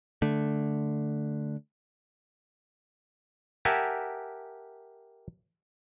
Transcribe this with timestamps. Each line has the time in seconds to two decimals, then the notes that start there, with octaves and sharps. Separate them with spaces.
0.22 D3 A3
3.65 G4 A#4 E5 F#5 G#5 A5